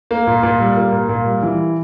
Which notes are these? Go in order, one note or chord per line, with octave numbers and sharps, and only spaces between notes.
A#3
A#2
A#2
G3
A#3
A#2
A#2
G3
E3